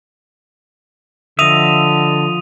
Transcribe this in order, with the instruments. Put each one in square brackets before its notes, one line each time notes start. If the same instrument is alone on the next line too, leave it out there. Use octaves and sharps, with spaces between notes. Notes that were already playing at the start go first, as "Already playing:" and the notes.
[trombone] D3 [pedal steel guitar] F3 D#5 E5 [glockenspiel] D#6 D#7 F7